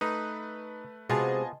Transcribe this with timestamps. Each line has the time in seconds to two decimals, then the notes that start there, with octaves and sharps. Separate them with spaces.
0.01 A3 D#4 B4
1.10 C3 G#3 B3 F4 F#4 D#5 G#5 A5